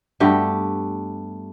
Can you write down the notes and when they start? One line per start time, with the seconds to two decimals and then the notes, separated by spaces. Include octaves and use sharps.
0.20 G2 A3 B3 G4